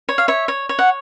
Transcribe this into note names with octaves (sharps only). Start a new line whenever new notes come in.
C#5
F5
C#5 E5
C#5
C#5
F#5